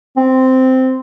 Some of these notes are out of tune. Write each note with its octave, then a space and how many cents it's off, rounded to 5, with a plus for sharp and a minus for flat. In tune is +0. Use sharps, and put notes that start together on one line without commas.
C4 -10